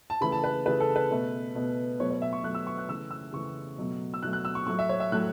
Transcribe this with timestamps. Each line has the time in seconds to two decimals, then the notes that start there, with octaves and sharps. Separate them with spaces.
0.10 A5
0.21 C#3 E3 A3 B5
0.32 A5
0.44 B4
0.65 C#3 E3 A3 B4
0.80 A4
0.96 B4
1.11 B2 A3
1.55 B2 A3
2.00 B2 F#3 A3 C#5
2.11 C#5
2.22 E5
2.33 C#6
2.43 B2 F#3 A3 F#6
2.55 E6
2.67 C#6
2.78 F#6
2.89 C#3 E3 A3 E6
3.11 E6
3.33 C#3 E3 A3 C#6
3.78 B2 F#3 A3
4.14 E6
4.23 B2 F#3 A3 F#6
4.33 F#6
4.45 E6
4.55 C#6
4.66 A2 F#3 A3 C#6
4.79 E5
4.89 C#5
5.00 E5
5.12 A2 F#3 A3 F#6